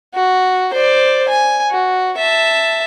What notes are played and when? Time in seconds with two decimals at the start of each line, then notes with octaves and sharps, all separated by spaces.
0.15 F#4
0.74 C5 D5
1.28 G#5
1.70 F#4
2.17 E5 A5